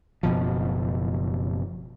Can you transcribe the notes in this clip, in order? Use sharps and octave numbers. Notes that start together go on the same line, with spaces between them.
F#1 B2 F3